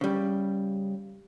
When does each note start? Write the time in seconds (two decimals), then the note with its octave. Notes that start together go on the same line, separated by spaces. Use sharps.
0.01 C#3 G3